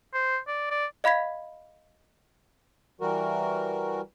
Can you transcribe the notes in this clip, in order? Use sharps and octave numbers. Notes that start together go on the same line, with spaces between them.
C5
D5
D5
D#5 F5 B5 G#6 B6
E3 G3 F#4 A#4